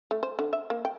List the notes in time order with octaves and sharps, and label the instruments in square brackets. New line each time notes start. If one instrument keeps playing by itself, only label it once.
[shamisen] A3
C5
D3
E5
A#3
G5